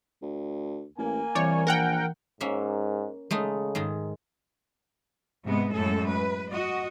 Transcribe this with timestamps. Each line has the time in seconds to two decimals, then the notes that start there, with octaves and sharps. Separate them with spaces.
0.22 D2
0.98 A1 A#3 G#5
1.35 C2 E3 C#5 D5
1.67 A#1 A#4 F#5 G5
2.40 G#2 A#3 C#4 E5
3.31 C#3 G#3 A3 D#4
3.75 G#2 D#3 G#3
5.44 G#2 C3 G#3 B3
5.74 F#2 A2 G#3 A4
6.08 B4
6.51 F#4 D#5